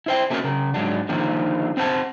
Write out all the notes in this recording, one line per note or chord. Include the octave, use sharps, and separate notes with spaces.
E4 C5 G5
A3 A#3 C#4 F#4 G4 A#4
C#3 A#4
G#2 F#3 D4
D3 D#3 F3 A#3
C4 C5 F#5 G#5 A5